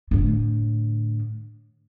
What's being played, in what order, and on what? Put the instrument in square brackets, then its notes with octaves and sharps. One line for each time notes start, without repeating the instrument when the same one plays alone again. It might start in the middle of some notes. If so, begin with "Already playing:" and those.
[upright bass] A2 D3